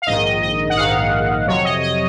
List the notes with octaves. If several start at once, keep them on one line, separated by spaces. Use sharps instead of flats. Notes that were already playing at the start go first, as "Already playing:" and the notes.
F5
A#1 G#2 D#3 D#5
D#5
F#5
A#1 G#2 D#3 F5
F2 C3 F#3 C#5
D#5
D#5